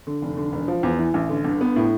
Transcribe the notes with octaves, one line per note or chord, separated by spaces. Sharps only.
D3
F1
D3
E1
F3
E2
E3
A1
D3
G1
B3
A2